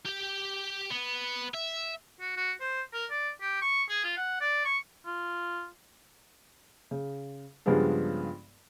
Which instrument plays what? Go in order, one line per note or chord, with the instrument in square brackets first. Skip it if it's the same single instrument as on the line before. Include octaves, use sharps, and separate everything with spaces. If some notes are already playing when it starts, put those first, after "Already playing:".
[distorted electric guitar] G4 G5
B3
E5
[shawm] F#4
F#4
C5
A#4
D5
G4
C#6
G#4
F4
F#5
D5
C#6
[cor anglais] F4
[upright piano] C#3
G2 C#3 F3 G#3 B3 D4